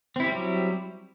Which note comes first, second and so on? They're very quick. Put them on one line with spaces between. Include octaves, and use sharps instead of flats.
C4 E4 G4 G3 F#3